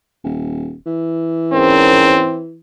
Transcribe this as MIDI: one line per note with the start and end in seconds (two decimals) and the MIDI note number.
0.24 0.74 27
0.86 2.59 52
1.53 2.23 44
1.53 2.40 60
1.53 2.23 61
1.53 2.23 70